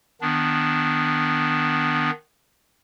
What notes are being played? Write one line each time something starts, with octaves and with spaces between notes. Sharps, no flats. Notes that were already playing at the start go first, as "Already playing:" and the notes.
D#3 B3 D4